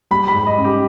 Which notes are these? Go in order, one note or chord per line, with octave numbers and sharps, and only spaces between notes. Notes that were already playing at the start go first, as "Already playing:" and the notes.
G3 B5
B5
G#2
D#5
C#4
G4